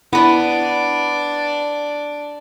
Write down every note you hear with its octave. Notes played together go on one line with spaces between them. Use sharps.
B3 D4 E4 B4 D5